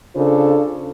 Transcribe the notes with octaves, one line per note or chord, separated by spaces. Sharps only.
C#3 D4 F4 A4 C5